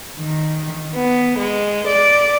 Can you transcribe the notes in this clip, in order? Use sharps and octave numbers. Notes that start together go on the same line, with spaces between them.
D#3
B3
G#3
D5